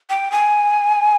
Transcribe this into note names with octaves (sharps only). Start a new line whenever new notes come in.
G5
G#5